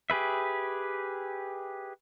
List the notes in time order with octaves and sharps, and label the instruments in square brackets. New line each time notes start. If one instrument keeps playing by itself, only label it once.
[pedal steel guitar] G4 G#4 B4 E5